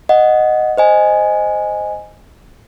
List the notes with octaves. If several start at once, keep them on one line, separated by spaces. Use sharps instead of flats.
D#5 F#5
C5 D#5 G#5